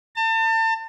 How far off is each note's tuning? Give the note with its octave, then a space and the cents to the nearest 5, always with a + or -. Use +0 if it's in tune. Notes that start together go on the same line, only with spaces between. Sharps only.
A5 +35